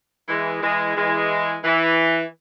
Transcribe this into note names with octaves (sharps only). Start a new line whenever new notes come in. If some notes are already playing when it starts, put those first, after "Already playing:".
E3 G#3
E3 G#3
E3 G#3
E3